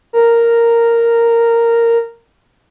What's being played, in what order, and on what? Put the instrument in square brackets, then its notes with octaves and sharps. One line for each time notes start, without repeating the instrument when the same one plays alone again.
[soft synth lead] A#4